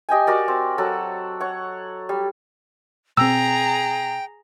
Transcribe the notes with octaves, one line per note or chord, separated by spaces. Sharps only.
G4 D#5 G5 G#5
F#4 A#4 D5
C4
F#3 A4 F#5
C#5 F#5
G3
B2 C4 G#4 G5 A#5 E6